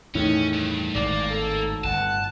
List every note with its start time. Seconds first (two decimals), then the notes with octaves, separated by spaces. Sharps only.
0.15 E2 A2 D#3 C#4
0.53 G2
0.95 G#1 G#2 A#3 D5
1.31 A4
1.84 G1 F#5 A5